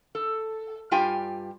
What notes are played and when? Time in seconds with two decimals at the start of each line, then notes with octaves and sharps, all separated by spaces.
0.15 A4
0.91 G2 F4 G4 G5 G#5